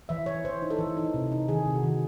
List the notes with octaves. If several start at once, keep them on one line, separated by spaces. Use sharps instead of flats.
E3 E5
E3 C#5
E3 C5
D#4
A4
E3
D#4
C3
D#4
D#3 G#4
C3
F#4
D#3